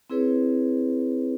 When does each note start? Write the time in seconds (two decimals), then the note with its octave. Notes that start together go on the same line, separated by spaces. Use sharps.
0.10 C4 E4 G#4 B4 C#5